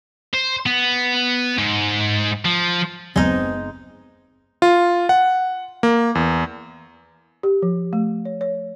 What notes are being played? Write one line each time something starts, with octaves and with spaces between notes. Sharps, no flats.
C5
B3
G#2
F3
F#1 D#2 C#3 F#3 G#3 B3 C4 D#4
F4
F#5
A#3
E2
G4
F3
A3
C#5
C#5